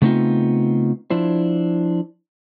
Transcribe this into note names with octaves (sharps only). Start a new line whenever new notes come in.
C#3 A3 B3 C4 D#4 F4
F3 D4 E4 C5